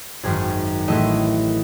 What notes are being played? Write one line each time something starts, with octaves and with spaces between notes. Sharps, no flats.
G#1 F#2 D#3 G#4
A1 A2 E3 A3 D#5